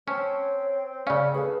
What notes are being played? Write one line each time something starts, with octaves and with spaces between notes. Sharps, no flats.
C4 C#4 C#5 A5
C#3 C#4 D5 F5
G#4 A4 B4